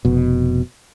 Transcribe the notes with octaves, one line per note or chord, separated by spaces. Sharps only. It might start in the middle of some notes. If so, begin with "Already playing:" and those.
F1 B2